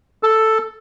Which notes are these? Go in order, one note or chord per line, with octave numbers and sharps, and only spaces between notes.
A4